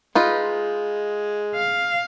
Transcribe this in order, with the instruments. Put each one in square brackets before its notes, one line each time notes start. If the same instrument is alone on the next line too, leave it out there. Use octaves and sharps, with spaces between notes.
[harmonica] G#3 [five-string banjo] D#4 F4 B4
[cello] F5